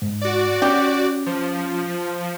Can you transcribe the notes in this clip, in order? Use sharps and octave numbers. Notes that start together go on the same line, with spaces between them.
G#2
F#4 D5
C#4 G4
F3